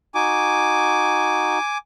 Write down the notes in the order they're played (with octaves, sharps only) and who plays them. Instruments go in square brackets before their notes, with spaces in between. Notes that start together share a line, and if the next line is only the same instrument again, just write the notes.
[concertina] D#4 F#4 [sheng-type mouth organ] G#5 D6